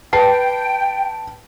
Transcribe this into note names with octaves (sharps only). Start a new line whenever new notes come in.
B4 G5 A5 C7